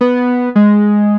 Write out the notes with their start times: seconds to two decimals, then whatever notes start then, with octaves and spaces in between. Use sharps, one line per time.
0.01 B3
0.55 G#3